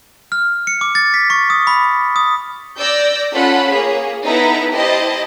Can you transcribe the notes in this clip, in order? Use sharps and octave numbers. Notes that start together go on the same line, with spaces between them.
F6
C#7
D6
A6
B6
C#6
D#6
B5
D#6
D5 E6 G6 A#6
C#4 F4 A4 F#5 B5
A#3 G#4 C#5
B3 D#4 E4 A4 E5 A#5
E4 G4 C5 D#5 A5